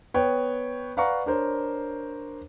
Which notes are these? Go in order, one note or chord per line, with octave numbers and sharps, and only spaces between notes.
B3 B4 C#5 G5
B4 D5 F5 F#5 A#5 C#6
D4 A#4 C5 C#5